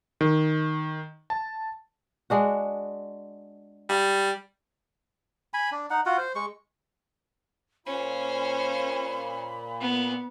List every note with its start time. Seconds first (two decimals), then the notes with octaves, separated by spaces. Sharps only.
0.21 D#3
1.30 A5
2.30 G#3 D4 F#4
3.89 G3
5.54 G#5 B5
5.72 D4
5.90 D#4 F#5
6.06 F4 F#4 F#5
6.18 C5
6.35 G#3 C#6
7.86 A#2 C#4 C5 B5
9.80 B3